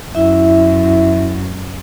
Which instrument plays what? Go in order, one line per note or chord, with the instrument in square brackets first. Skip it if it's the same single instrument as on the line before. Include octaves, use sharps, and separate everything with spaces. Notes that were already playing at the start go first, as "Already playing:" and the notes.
[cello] F#2 [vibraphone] E4 E5